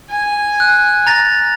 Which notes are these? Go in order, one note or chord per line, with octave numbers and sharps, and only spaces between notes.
G#5
F#6
A#5 A6 A#6